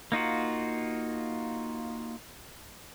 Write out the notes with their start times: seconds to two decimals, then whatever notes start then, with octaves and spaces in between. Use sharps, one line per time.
0.12 A#3 D#4 F4 F#4